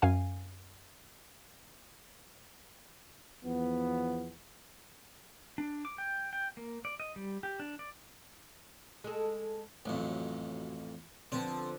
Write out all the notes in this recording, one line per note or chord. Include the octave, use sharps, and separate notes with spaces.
F#2 F5 G#5
E2 F3 B3
D4
D6
G5
G5
A#3
D5
D#5
G3
G4
D4
D5
G#3 A4
A1 F2 F#3
D3 F3 B3 C4